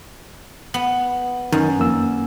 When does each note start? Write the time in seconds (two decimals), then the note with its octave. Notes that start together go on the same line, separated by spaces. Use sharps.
0.74 B3
1.52 F#2 D#3
1.79 F2 A#3 E6